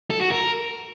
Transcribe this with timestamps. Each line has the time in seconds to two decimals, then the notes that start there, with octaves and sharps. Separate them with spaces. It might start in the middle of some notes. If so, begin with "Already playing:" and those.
0.10 A4
0.21 F#4
0.31 A#4